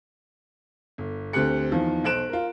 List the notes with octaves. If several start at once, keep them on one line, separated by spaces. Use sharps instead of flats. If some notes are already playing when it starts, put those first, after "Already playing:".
G1
D2 C4 G4 F#6 C#7
E2 D#3 F3
B1 C5 F#6 D7 E7
F4 A#4